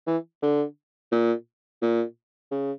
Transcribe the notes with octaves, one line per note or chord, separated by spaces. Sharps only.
E3
D3
A#2
A#2
C#3